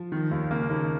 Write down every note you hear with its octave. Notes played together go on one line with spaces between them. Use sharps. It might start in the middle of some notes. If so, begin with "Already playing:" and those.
Already playing: F3
D#3
D#2
C#3 A#3
D#2 D#3